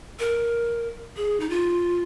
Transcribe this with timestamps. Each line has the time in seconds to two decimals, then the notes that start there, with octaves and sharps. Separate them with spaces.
0.19 A#4
1.17 G#4
1.40 D#4
1.50 F4